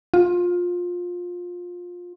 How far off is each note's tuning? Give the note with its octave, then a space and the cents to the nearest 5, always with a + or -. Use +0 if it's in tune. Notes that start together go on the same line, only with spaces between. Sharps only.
F4 +20